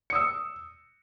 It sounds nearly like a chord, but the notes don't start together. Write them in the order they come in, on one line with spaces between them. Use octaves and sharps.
C#7 D#6 E6